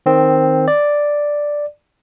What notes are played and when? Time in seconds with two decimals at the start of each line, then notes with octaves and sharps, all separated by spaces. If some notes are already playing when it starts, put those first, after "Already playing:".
0.06 D#3 C4
0.68 D5